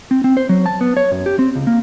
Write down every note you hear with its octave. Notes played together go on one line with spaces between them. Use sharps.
C4
C4
C5
F#3
A5
B3
C#5
F#2
G4
C4
C#2
A#3